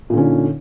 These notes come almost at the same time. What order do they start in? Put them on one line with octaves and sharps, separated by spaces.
A#2 D3 C#4 D#4